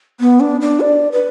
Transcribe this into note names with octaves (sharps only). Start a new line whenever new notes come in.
B3
D4
D4
D5
B4